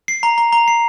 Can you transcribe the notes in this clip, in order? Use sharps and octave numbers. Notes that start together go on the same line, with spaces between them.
C7
A#5
A#5
A#5
C7